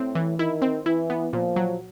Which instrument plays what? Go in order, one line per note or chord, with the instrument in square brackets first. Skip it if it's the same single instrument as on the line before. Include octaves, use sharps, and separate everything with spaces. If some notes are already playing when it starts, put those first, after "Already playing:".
Already playing: [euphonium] A2 [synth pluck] C4
[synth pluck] E3
[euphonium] D#3 [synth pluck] E4
[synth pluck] C4
[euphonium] E3 [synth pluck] E4
[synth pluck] B3
[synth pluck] A#2 [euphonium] F3
[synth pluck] F#3